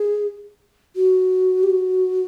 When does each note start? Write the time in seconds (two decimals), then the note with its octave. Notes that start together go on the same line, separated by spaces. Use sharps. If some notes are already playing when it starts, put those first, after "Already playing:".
Already playing: G#4
0.96 F#4
1.63 G4
1.70 F#4